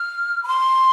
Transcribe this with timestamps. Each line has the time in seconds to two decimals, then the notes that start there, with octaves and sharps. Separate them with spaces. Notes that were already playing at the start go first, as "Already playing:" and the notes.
Already playing: F6
0.43 B5
0.48 C6